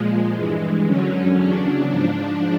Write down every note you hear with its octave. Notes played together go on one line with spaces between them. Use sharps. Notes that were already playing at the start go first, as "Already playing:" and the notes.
Already playing: A#2 F3 G#3
G2 E3
F#2 D3 F#3 C#4
E2 C#3 F#3 D4
G#2 F3